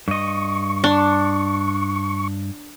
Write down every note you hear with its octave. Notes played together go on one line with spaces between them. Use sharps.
G2 D#5 C#6
D4